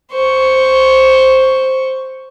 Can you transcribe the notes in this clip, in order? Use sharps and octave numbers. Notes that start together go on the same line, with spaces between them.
C5 C#6